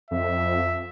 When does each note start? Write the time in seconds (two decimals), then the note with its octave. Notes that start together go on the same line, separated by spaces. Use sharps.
0.11 F2 E5